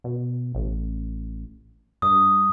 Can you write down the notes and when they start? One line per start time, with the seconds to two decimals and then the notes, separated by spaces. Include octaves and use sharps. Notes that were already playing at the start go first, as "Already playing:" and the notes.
0.04 B2
0.55 A1
2.02 G2 D#6